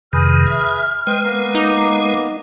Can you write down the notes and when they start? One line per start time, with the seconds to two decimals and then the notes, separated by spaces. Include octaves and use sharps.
0.13 F2 C3 D#3 G#4 B4 F6
0.47 E5
1.07 G#3 B4 C5 D#5 G5
1.25 A#3 B3 A#5
1.55 D#4 D6